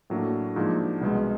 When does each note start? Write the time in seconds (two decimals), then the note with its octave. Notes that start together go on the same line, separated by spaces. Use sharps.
0.10 A2 F#3 A#3 D4
0.56 G#2 F3 A#3 D4
1.01 C2 B2 G#3